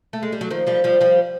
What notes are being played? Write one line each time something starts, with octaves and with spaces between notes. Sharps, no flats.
A3
G#3
G3
F#3
D#3 F3
F3 G3
F3 G3
F3 G3